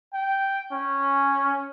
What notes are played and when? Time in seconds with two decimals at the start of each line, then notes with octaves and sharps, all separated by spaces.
0.14 G5
0.72 C#4